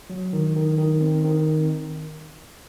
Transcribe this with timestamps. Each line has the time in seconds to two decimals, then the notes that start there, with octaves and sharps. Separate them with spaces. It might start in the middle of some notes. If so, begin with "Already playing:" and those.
0.10 F#3
0.33 D#3
0.56 D#3
0.78 D#3
1.01 C4
1.24 D#3